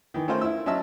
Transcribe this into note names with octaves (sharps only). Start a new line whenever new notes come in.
D#3 E3
A3 C#4 F4 A4 A#4 C5
E4 E6
F#3 C#4 D#5 E5 A5 E6